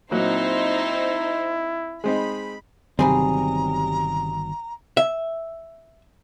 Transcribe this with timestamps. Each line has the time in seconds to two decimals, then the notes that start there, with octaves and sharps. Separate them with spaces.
0.11 A#2 F#3 C4 D#4 E4 C5
2.04 G#3 C4 D#4 B5
2.99 G1 C3 D#3 F#3 G3 C4 G#4 A#5
4.97 E5